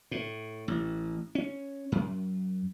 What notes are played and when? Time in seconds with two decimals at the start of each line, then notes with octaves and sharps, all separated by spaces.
0.11 A2
0.68 A1
1.35 C#4
1.92 F#2